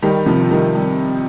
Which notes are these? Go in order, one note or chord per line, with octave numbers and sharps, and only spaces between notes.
D#3 G3
C3 F3
D#3 G3
G3